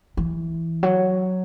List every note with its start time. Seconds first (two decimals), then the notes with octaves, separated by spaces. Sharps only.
0.17 E3
0.83 F#3